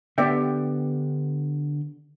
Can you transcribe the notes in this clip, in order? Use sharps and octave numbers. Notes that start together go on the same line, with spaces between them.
D3 B3 G4 D5 E5 G5